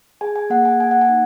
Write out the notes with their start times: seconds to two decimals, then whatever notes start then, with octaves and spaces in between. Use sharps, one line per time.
0.21 G#4 G#5
0.36 G#5
0.50 A#3 F#5
0.65 G#5
0.79 A#3 G#5
0.91 F#5
1.01 G#5
1.09 D#4